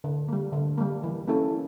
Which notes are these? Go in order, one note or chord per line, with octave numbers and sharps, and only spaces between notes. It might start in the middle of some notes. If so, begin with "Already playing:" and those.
D3
G3 A#3
D3
G3 A#3
E3
A#3 C#4 E4 A4